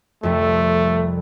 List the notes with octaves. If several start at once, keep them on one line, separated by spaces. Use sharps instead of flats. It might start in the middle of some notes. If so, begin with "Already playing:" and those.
C2 F2 A3